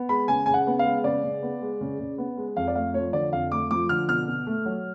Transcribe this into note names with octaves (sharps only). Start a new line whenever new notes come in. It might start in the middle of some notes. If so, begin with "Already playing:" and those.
Already playing: B3
G#3 B5
C#3 G#5
C#3 G#5
F#5
B3
F5
G#3
C#3 D5
C#3
B3
G#3
C#3
C#3
B3
G#3
F2 F5
D5
A3 F5
F3 C#5
D3 D5
F2 F5
A3 D6
F3 D6
D3 F6
B2 F6
B2
A3
F#3